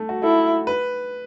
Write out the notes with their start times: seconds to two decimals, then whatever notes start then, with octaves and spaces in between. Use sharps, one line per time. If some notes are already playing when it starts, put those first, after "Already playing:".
Already playing: A3
0.09 F#4
0.23 E4 A4
0.67 B4